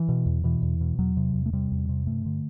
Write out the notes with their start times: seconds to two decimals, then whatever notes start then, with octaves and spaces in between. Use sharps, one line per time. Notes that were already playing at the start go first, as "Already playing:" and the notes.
Already playing: E3
0.09 B2
0.26 E2
0.44 B2 E3
0.62 E2
0.81 B2
0.98 E2 F#3
1.17 C3
1.35 E2
1.46 A3
1.53 C3 G3
1.72 E2
1.89 C3
2.07 G2 A3
2.26 D3